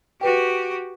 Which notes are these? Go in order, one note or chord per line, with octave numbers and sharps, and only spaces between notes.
F#4 G4 B4 G5